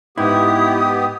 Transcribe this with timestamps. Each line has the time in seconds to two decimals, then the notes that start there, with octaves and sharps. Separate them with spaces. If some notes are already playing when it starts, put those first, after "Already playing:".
0.18 G#2 B3 E4 G4 D#6